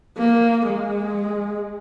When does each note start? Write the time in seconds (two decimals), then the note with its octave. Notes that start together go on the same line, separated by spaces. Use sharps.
0.18 A#3
0.67 G#3